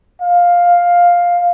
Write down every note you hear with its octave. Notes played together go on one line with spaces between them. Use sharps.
F5